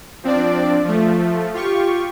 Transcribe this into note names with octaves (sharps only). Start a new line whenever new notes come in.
F3 C4 D4 D5
F3 A3
F4 G4 C#6